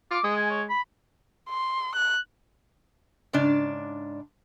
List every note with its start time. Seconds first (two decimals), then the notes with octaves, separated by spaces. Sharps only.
0.11 F4 D6
0.24 G#3 D#6
0.36 G#5
0.50 C#5
0.69 B5
1.50 C6
1.96 F#6
3.33 G#2 C#3 D4 D5